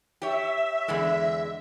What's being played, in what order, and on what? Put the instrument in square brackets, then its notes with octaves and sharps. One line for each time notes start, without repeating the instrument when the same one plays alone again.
[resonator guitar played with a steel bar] G4 C#5 [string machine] E5
[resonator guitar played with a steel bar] E2 D3 G#3